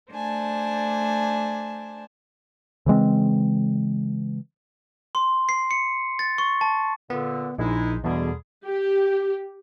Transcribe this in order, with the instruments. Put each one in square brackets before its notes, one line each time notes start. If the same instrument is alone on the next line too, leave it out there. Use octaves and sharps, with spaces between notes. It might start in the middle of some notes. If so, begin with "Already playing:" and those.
[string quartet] A3 D4 C5 G#5 A5
[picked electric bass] C#3 E3 G#3 C4
[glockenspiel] C6
C7
C#7
A6
C#6
A5
[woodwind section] A#2 D3 [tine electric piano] B3
[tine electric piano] A#1 [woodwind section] G#3 D#4 E4
[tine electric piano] E2 B2 [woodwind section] D3 G3 G#4
[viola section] G4